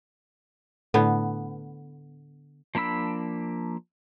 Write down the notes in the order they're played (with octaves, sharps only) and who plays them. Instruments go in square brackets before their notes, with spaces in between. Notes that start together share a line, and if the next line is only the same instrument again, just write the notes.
[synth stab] A2 [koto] D3 B3
[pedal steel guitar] F3 A#3 D4 B5 E6